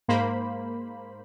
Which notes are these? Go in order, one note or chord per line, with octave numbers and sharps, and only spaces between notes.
G#2 A#3 C5 B5